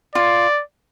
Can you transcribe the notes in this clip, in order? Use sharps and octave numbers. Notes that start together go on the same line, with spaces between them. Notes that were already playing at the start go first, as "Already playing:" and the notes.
F4 D5